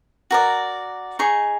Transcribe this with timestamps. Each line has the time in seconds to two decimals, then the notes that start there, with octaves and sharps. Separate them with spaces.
0.31 F#4 A#4 D5
1.19 D#4 G#4 C#6